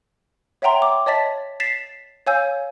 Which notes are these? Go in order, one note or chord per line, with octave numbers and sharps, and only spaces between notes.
C#5 E5 F#5 G5 A#5 C6
D6
C#5 D#5 A5 A6 B6
A6 B6 C7 E7
C#5 F5 G#5 E6 G6